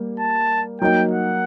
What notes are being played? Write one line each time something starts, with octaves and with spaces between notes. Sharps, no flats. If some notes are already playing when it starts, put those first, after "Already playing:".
Already playing: G3 A#3
A5
F#3 A#3 D#4 G5
F#5